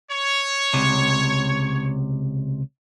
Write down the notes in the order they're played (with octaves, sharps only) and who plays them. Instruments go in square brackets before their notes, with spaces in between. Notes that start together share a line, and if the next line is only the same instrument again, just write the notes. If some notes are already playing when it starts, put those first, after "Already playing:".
[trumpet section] C#5
[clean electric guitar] C#2 C3